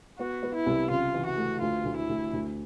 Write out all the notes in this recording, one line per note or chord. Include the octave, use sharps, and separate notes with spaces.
B3 F#4
B3
E4
C2
C#3 F4
E3
F#4
A3
D2 F4
D2
E4
D2
D2